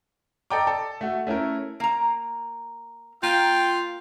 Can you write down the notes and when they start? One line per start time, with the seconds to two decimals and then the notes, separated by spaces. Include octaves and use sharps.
0.50 A4 D5 D#5 G5 A#5 D6
0.67 A4
1.01 A3 F#4
1.27 A3 C#4 E4 A#4
1.80 A#3 A#5
3.23 A#3 F4 G5